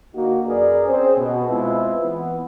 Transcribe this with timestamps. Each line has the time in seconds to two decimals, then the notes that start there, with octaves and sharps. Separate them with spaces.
0.15 D3 A#3 D#4 F#4
0.47 F#2 G#4 A#4 B4 D5
0.86 C4 C#4 G#4 C5
1.17 B2
1.48 G#3 C4 E4 F4 B4
2.01 E3 B3